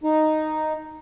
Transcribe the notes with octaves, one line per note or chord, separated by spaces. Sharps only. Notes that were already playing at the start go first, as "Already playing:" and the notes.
D#4